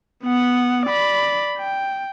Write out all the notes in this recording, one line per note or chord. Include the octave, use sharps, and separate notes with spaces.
B3 F#5
D5 B5
G5